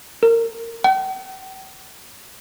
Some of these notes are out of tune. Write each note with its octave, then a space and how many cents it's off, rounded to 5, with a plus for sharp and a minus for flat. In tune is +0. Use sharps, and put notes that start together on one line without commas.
A#4 -20
G5 -45